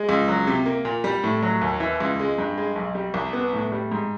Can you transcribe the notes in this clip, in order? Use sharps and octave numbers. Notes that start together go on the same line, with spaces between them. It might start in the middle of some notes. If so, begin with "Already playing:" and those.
Already playing: G#3
C#2
F#3
C3
A#3
A#2
G3
A2
F#3
D#2
E3
C#2
G#3
G2
G#3
B1
G3
C2
B3
A2
G3
G#2